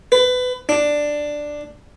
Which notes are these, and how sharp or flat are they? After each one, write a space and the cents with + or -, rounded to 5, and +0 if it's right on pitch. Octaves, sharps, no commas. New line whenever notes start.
B4 +25
D4 +5